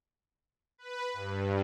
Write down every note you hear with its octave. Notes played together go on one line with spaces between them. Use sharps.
B4
G2